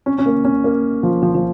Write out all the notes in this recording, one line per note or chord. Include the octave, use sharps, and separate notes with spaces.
C#4
C#4
A#3
C#4
A#3
F3
F3
F3